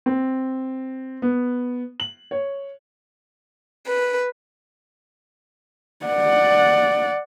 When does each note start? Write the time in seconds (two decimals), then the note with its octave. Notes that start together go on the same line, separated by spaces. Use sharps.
0.06 C4
1.22 B3
2.00 F#7
2.31 C#5
3.85 B4
6.06 D5 F#5